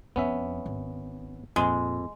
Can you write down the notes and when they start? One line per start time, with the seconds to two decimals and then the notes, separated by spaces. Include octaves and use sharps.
0.16 F2 B3 C#4 E5
0.66 G#1
1.56 F2 A#2 G#3